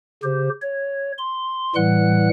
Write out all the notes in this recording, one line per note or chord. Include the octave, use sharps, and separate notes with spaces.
C#3 G4 C5
C#5
C6
A2 E3 G3 F#5 F#6